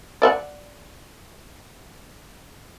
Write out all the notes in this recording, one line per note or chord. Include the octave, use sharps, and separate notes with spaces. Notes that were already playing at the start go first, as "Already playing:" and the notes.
D5 E5 F#5